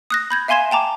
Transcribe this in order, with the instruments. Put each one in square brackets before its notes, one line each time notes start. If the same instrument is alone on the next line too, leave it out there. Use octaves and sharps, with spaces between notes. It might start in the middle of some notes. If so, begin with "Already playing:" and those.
[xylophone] D#6 F#6 A#6
B5 G6 G#6
E5 F5 G#5 C6 G#6 E7
G5 A5 A#5 D6